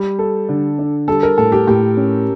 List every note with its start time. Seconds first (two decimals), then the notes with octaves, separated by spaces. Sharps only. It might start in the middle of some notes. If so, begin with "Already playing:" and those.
Already playing: G3
0.19 A4
0.49 D3
0.79 D4
1.08 G3 A4
1.23 A#4
1.37 A2 A4
1.52 G4
1.67 A2 G4
1.97 C#4